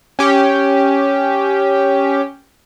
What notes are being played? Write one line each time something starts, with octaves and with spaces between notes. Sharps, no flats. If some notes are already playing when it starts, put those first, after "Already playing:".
C#4 G4